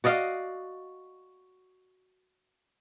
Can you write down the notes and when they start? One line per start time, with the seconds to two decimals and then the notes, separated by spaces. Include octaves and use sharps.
0.04 F#4 D5 D#5 F5